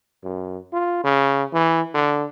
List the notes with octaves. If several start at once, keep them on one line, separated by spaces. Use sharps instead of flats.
F#2
F4
C#3
E3
D3